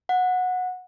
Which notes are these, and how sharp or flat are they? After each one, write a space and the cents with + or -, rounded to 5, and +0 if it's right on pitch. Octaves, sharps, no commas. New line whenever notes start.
F#5 -15